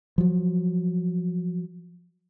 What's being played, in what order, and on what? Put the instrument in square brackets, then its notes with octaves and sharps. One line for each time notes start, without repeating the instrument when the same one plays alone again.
[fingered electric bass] F3 F#3